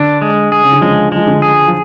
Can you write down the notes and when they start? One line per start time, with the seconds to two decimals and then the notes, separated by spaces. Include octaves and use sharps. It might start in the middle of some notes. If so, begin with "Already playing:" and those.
Already playing: D3 D4
0.22 G#3
0.52 G#4
0.64 C#3
0.72 D3
0.81 C#3 F3 G#3
1.12 F3 G#3
1.28 D3
1.42 G#4
1.68 F3